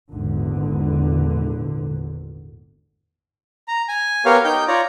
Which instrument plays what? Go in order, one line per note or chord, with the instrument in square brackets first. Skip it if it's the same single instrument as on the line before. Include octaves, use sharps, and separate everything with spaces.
[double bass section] G#1 E2 A#2 D3
[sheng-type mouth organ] A#5
G#5
B3 G4 A#4 C#5 F5
D#4 G5 G6
F4 C#5 D5 A#5